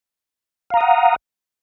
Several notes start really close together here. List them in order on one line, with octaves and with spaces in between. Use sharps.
F5 A#5 D#6 F#5